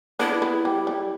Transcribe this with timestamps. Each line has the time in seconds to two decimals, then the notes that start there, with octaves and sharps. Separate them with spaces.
0.19 B3 D4 E4
0.42 B3
0.65 G3
0.87 G3